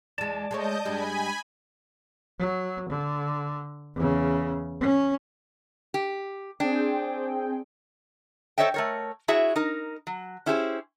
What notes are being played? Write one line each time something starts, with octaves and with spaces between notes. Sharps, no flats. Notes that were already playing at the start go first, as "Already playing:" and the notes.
E2 G#3 D5 A5
G#3 A3 C#5 D#5 G6
G2 G3 G#3 G#5 B5
F#3
D3
E2 C#3
C#4
G4
C4 D4 G#4 G5
A4 C5 C#5 D#5 E5 G5
A3 A#4 C#5
E4 F#4 G#4 C#5 E5
D#4 A#4
F#3
C#4 E4 G4 G#4 C5